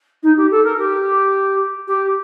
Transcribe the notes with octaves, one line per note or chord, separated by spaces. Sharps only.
D#4
G4
A4
A#4
G4
G4